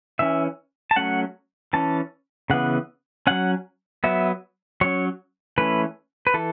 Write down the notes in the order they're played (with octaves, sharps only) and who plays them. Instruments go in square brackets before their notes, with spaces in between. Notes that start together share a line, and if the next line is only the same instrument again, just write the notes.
[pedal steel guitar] E3 C#4 E5
A5
F#3 A3 C#4 F#5
E3 C#4 A5
C#3 E3 B3 F#5
F#3 C#4 F#5
F#3 B3 E5
F#3 C#4 C#5
E3 A3 C#4 B4
B4
E3 A4